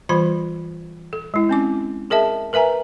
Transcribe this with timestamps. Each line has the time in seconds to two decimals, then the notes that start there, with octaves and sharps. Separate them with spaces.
0.09 E3 G3 F4 C5 B5
1.13 A4
1.34 G#3 E4
1.49 C4 C#4 D6
2.10 G#4 A#4 D#5 E5 A5
2.53 A#4 B4 E5 G#5 A#5